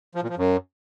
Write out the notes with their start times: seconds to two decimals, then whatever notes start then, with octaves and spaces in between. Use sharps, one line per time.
0.15 F3
0.22 A#2
0.30 F3
0.37 F#2